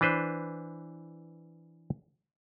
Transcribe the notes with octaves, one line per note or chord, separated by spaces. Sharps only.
E3 D4 B4 C5